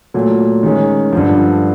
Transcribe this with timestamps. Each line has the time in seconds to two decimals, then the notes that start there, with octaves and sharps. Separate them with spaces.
0.14 A#2 F#3 A3
0.63 D#3 G#3 C#4
1.12 G2 D3 F3